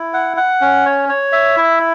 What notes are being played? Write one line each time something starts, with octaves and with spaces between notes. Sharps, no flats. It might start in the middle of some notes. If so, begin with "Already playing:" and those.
Already playing: E4
F#5
F#5
C#4
C#5
C#5
E5
E4